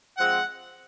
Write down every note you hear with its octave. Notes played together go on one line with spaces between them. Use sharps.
F3 G#3 C4 F#5